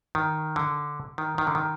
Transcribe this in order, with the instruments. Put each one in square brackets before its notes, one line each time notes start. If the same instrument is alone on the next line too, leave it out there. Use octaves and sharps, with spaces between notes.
[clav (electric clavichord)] D#3
D3
D#3
D#3
D3
D#3